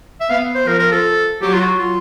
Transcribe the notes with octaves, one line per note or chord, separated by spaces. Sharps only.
E5
B3 F5
C5
F3 A#4
A#4
A4
F#3 G4
F4
F#4
F4